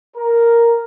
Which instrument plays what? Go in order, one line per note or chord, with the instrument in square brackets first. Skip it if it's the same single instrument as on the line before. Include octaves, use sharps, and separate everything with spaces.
[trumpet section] A#4